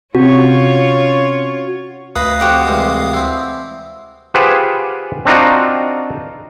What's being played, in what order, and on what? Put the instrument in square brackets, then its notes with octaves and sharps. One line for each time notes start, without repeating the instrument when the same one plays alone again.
[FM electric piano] C3 [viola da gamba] C#4 F4 C#5 [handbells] F#4
[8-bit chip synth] D2 F5 D#6 [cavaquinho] B4 D#5
[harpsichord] F2 F3 [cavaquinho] F#4 G4 F#5
[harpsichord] C2 E3 G#3
C4 E4
[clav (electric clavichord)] F4 G4 G#4 B4 C5 F#5
C4 D4 D#4 F4 F#4